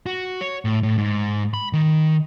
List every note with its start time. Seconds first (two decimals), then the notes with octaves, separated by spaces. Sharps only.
0.06 F#4
0.41 C#5
0.65 A2
0.83 A2
0.98 G#2
1.54 B5
1.73 D#3